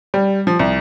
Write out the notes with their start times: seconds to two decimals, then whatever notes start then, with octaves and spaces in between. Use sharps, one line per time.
0.14 G3
0.47 F3
0.59 C2